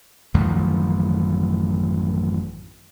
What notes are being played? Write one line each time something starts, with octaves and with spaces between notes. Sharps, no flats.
A1 F#2 D#3 F3